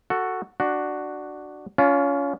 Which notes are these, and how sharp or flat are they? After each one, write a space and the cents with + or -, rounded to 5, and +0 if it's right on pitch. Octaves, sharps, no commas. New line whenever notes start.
F#4 +0 A4 +15
D4 +10 F#4 +5
C#4 +25 F4 +0